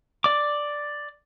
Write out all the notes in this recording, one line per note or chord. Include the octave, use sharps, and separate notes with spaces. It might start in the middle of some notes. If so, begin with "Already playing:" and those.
D5 D6